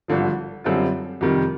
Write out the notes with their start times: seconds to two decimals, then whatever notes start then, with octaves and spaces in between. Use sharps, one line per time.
0.08 G#1 G2 D3 F3
0.64 F#2 D3 G3 C4 F4
1.21 F2 C3 D#3 G3